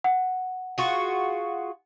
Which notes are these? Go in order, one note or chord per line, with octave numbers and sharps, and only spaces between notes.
F#5
F4 F#4 G#4